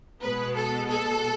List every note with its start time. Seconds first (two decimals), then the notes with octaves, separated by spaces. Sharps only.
0.21 B2 G#3 B3 B4
0.56 A4
0.89 A4